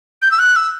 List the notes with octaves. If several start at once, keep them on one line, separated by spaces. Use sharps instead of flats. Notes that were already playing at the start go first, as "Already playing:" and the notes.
G6
E6
F#6
E6